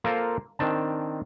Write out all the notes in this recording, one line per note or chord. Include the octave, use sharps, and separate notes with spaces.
A#3 F4 A4 A#4 C5 F5
D#3 C4 D4 A5